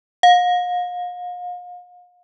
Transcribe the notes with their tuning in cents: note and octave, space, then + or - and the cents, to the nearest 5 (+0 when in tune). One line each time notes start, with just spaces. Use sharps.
F5 +40